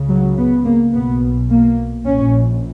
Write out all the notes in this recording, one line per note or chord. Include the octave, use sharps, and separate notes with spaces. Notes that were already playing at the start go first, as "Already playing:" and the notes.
Already playing: C#2 C#3
F#3
B3
A#3
B1 B2 B3
A#3
A#1 A#2 C#4